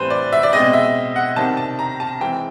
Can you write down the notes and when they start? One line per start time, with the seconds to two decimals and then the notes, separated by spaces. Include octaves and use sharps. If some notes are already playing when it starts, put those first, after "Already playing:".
Already playing: A2 E3 G3 C4 B4 C5
0.10 D5
0.33 E5
0.43 D5
0.53 B2 G#3 C4 D#5
0.73 E5
1.16 F#5
1.36 C3 D#3 G3 C4 A5
1.57 A5
1.79 A#5
2.00 A5
2.21 E3 G#3 C4 G5